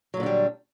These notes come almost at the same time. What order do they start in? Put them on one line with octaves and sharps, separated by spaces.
F#3 A#2 D3 D4 G3